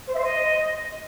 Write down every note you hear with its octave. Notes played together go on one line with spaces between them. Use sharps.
C5
E5
C5
D#5